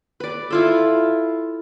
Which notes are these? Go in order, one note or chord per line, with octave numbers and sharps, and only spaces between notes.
B4 D5
E4 F4 A4